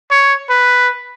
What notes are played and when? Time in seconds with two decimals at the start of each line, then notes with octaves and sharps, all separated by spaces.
0.11 C#5
0.50 B4